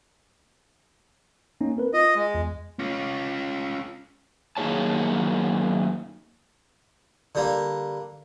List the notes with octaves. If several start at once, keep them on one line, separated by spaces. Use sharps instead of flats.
A#3 C#4 D#4
C4 A#4 B4
F4 D#5
G#3
E2
C#4 F4
F#2 D#3 A#3 G#4 C#5 A5
D3 G3 A#3